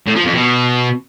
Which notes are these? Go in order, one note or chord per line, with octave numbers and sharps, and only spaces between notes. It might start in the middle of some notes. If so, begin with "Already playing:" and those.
A2
F3
F2
B2